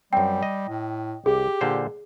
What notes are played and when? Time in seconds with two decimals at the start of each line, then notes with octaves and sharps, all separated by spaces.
0.13 F#2 G3 C4 G5
0.43 D#5
0.68 A2
1.26 C2 G4 G#4
1.61 A#2 D3 C5